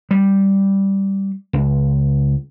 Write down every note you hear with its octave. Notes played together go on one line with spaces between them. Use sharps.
G3
C#2